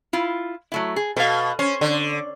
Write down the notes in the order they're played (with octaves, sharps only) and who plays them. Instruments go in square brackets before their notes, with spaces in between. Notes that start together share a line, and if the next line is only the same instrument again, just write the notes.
[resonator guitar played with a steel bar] E4 F4
F#3 A3 E4
G#4
[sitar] B2 [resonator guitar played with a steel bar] A4 F5
[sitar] C#4 [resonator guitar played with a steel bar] C5 C#5
[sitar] D3